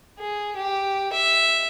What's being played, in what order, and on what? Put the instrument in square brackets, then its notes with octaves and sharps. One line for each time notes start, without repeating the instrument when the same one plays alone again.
[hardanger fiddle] G#4
G4
E5